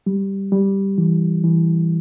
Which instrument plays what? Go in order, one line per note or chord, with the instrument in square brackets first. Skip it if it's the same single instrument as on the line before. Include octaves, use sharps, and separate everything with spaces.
[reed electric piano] G3
G3
E3
E3